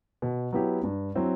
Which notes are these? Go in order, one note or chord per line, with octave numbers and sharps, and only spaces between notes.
B2
F#3 B3 E4 G4
G2
F#3 C4 E4